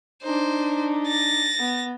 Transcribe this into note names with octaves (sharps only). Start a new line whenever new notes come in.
D4 D#4 C5
A6 A#6
B3